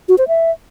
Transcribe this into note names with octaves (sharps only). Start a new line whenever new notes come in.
F#4
C5
E5